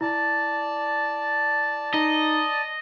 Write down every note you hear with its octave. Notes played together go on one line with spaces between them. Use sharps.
E4 D5 A5
D#4 D#5